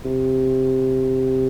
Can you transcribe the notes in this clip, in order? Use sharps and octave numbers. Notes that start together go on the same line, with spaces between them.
C3